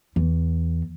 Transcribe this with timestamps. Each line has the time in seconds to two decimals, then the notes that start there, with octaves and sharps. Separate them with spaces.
0.16 E2